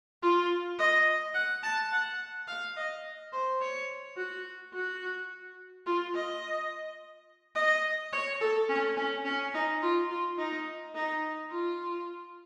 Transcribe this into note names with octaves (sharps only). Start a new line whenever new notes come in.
F4
D#5
F#5
A5
F#5
F5
D#5
C5
C#5
F#4
F#4
F4
D#5
D#5
C#5
A4
C#4
C#4
C#4
D#4
F4
F4
D#4
D#4
F4